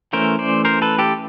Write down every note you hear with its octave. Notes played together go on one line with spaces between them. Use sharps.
E3 A3 C#4 A#4 C5
C5 D5
A#4 C5
A4 B4
G4 A4